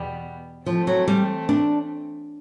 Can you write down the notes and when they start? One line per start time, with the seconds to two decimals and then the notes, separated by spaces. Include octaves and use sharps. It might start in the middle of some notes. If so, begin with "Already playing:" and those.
Already playing: E2 B2 G3 B3
0.66 E3 F3 A3 C4
0.87 F#3
1.08 G3
1.49 D4